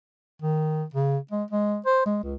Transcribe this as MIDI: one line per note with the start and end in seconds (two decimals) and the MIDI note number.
0.42 0.84 51
0.94 1.17 49
1.31 1.43 56
1.51 1.78 56
1.86 2.04 72
2.06 2.19 56
2.23 2.35 37